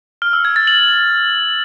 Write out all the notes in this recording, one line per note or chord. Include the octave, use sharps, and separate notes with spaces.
F6
E6
G#6
A6
F#7